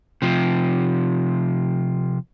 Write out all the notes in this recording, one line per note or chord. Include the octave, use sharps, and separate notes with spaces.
C3 F3